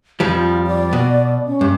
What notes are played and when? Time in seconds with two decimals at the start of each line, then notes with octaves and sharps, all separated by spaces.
0.20 F2 F3 G3 F4
0.67 D5
0.93 B2
1.47 C#4
1.61 G2